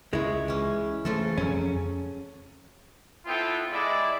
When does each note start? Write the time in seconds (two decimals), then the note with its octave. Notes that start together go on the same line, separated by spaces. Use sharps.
0.13 C#2 G#3 E4 C#5
0.48 E3 C#4
1.05 C#3 E3 F3 A3 A4
1.38 F2 F#3 C#4
3.26 B3 C4 E4 F4 A4 G5
3.71 G#3 E4 D5